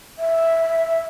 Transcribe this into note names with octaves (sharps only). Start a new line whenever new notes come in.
E5